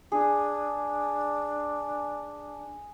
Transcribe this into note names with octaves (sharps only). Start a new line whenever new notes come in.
D4 G#4